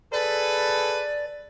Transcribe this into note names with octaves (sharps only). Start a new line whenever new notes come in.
G#4 A4 B4 D5